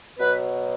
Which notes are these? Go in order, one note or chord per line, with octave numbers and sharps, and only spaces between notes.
B2 F#3 B4